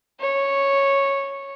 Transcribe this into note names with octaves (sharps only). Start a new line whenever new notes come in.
C#5